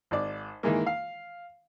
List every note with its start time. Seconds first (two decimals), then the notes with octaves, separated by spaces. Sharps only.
0.11 G#1 D5
0.63 D#3 E3 G#3 A#3
0.86 F5